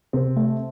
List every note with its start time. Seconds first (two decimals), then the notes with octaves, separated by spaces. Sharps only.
0.13 C3 C4
0.37 A3